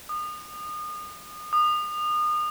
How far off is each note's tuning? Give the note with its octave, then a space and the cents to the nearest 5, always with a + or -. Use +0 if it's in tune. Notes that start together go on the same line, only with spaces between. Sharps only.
D#6 -35
D#6 -35